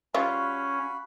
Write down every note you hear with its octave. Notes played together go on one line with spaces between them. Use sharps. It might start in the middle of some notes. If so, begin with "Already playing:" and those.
G3 C#4 F4 F#4 F5 B5